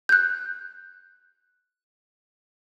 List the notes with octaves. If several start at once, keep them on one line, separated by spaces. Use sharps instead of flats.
F#6 G6